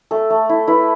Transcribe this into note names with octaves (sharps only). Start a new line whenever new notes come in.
A3 A4
A3
E4
E4 B4